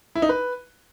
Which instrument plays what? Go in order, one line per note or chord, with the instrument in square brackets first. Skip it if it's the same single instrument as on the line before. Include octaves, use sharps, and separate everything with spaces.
[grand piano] E4
D#4
B4